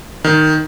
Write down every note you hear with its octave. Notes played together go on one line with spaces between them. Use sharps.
D#3